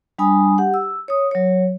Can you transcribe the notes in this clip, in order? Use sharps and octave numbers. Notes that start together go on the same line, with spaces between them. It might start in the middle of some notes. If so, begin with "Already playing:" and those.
G3 D4 G#5 B5 D#6
G4 F#5
E6
C#5 D#6
F#3 C#5